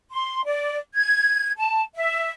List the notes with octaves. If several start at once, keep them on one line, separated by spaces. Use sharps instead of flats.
C6
D5
G#6
A5
E5